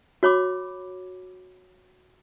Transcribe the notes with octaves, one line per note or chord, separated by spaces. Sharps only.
F#4 C#5 B5 D6